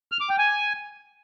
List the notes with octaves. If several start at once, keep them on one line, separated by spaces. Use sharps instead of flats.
F6
D6
G5
G#5